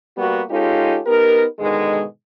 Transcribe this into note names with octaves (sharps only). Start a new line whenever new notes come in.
G3 A#3 B3 F#4
G#3 C#4 D#4 F4 G4 A4
B3 D#4 G4 A#4
G#2 B2 D3 D#3 G#3